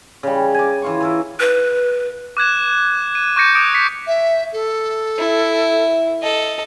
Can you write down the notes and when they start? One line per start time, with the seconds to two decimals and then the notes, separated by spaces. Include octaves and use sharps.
0.23 C#3 G3
0.54 G#5 D6
0.82 E3 F4 C#6
1.01 E3 E4 A#4
1.40 B4
2.37 D6 F#6 G#6 E7
3.15 D#7
3.36 C#6 D6 G6 A#6 C#7
3.55 D6 D#6 D7
3.75 B6 C#7
4.07 E5
4.53 A4
5.19 E4
6.22 A4 D#5